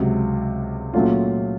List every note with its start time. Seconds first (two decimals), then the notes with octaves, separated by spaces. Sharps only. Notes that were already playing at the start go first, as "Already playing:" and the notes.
Already playing: C#2 C3 F#3
0.94 A#2 F#3 A3 C#4 F4